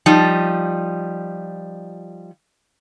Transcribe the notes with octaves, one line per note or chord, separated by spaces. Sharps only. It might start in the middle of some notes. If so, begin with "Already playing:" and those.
F3 G3 D#4